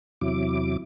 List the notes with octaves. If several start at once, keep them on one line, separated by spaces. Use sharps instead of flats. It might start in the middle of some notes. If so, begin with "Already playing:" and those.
E2 C3 F#3 E4 D6